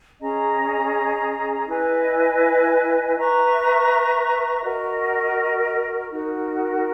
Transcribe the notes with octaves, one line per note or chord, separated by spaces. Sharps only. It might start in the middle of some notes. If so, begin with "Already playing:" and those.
C#4 G#4 D#5 A#5
E4 B4 D#5 G#5
B4 E5 A#5 C#6
F#4 A#4 D#5
D#4 F#4 A#4